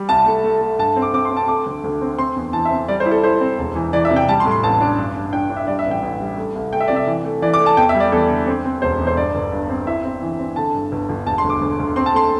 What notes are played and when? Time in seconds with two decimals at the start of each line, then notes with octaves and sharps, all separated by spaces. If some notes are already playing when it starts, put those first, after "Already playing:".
Already playing: G3
0.09 C2 A5
0.26 A3
0.44 A3
0.61 A3
0.78 G2 A5
0.96 C4
1.02 D6
1.13 C4 D6
1.25 C6
1.31 C4
1.37 A5
1.48 A3 D6
1.66 D2
1.84 D2
2.02 C4
2.18 C4 C6
2.36 E2
2.53 E3 A5
2.65 E5
2.71 C4
2.88 G3 D5
3.00 C5
3.06 E4
3.11 A4
3.24 E4 C5
3.41 C4
3.58 E1
3.75 E3
3.93 E3 D5
4.05 E5
4.11 C3
4.16 G5
4.28 G3 A5
4.40 C6
4.45 A2
4.51 C6
4.63 A1 A5
4.81 D4
4.98 G2
5.16 G2
5.33 D4 G5
5.50 D4
5.57 E5
5.67 G3 D5
5.79 E5
5.85 A1
5.91 G5
6.03 A1
6.20 G3
6.38 A3
6.55 C2
6.73 A3 G5
6.81 E5
6.88 C3 D5
6.96 E5
7.07 E3
7.25 A3
7.42 E3 D5
7.54 D6
7.60 A3
7.66 A5
7.77 E2 G5
7.89 E5
7.94 G3
8.00 D5
8.12 E2 A4
8.30 D3
8.47 C4
8.64 C4
8.82 E1 C5
8.99 E2
9.07 C5
9.17 G2 D5
9.35 G1
9.52 G2
9.70 C4
9.87 E4 E5
10.04 C4
10.22 E3
10.39 C4
10.56 D3 A5
10.74 G2
10.92 G1
11.09 G1
11.26 E1 A5
11.38 C6
11.44 D2
11.50 D6
11.61 D2
11.79 D2
11.96 C4 C6
12.06 A5
12.14 A3 C6